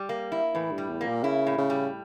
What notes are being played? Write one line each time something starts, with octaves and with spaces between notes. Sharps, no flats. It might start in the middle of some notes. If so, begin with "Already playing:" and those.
Already playing: G3
A#3
E4
A2 E3
G2
G3
E2
A#3
A#2
C#3 E4
A2
C#3
G3